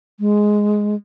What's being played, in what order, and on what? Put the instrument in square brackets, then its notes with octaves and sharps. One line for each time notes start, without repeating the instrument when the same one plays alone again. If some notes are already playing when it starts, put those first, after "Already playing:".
[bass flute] G#3